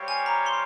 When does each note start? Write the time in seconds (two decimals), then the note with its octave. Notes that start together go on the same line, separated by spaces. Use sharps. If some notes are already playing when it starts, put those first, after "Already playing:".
Already playing: G3 C4 G4 C#5 F5
0.08 G#5
0.26 A#5
0.46 C6